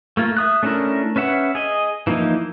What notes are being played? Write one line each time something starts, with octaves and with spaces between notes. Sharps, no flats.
A3 A#3 F4
E5 D#6 F#6
A3 C#4 D4 E4 A#4
C#4 B4 E5 F#5
G#4 D#5
E3 F3 A#3 D#4 E4